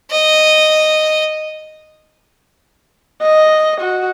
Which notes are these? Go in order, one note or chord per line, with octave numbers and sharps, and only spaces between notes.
D#5
D#5
F#4